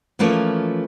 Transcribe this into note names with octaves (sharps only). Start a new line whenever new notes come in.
E3 F3 A3 A#3 C#4 F4